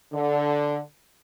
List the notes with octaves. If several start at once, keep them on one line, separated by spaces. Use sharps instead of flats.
D3